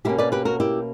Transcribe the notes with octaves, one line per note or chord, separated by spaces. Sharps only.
B2 A#3 C#4 E4 G4
B4 D5
G4 B4
F#4 A#4
E4 G4